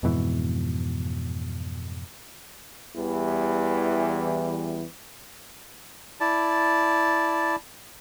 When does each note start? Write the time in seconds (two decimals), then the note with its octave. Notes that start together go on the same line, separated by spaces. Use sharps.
0.03 F2 G#2 B2 E3
2.95 E2 E3 G3
6.20 E4 D5 A5